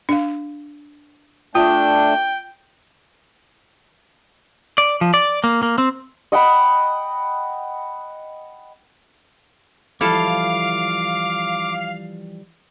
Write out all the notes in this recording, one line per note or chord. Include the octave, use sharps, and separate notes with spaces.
D4 F5
A3 D4 F4 G5
D5
F3
D5
A#3
A#3
C4
D#5 F#5 G5 B5
E3 F3 G3 E4 A4 F5 A5 D6